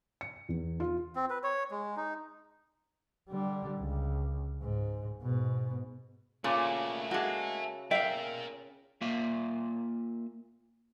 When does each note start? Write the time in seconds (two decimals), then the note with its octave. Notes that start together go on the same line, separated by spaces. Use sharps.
0.21 C#7
0.49 E2
0.80 F4
1.16 C4
1.30 B4
1.44 C#5
1.71 G#3
1.97 D#4
3.30 D3 G3
3.80 C#2
4.62 G#2
5.22 G#2 B2
6.44 A#2 C#3 A3 F#4
7.11 G#3 A#3 F#4 E5 A5
7.91 A#4 D5 E5 F5 G5
9.01 A#3 F4 E5 F5